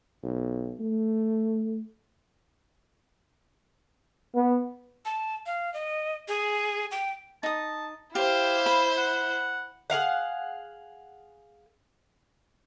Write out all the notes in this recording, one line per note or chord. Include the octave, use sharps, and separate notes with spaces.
B1
A3
B3
A5
F5
D#5
G#4
G5
D#4 A5 D#6
E4 G4 C5 F5
B5
F#5
G#4 A#4 F5 F#5